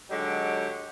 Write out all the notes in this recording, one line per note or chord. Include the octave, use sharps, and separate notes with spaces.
D3 F#3 G#3 D#4 G4